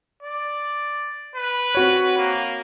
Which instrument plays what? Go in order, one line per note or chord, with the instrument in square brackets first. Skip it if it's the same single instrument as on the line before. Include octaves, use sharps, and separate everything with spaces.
[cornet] D5
B4
[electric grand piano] C4 F#4 C#5
[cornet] A#3